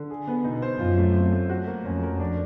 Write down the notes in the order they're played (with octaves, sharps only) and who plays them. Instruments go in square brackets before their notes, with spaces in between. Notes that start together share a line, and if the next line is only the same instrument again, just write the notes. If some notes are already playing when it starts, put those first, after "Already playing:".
Already playing: [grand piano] D3
G#4
B3
[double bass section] B2 [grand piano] D#4
[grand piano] C5
[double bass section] F#2 [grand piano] F4
[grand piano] A3
C4
A3
F#4
A#3
[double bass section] F2 [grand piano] C#4
[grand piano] A#4
D4